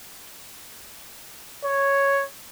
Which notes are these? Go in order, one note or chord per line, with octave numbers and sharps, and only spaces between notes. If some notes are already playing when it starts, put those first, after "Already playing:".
C#5